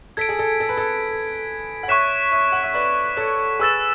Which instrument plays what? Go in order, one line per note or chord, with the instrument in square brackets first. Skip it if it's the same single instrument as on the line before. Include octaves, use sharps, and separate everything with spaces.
[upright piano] A4 [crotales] G#6 B6 D7
[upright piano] G#4
A4
A4
B4
A4
F#5
[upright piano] C#5 E5 [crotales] C#6 F#6 B6 E7
[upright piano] C#5 E5
F#5
E5
B4 D5
A4 C#5
[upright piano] G#4 B4 [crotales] C#6 E6 A6 E7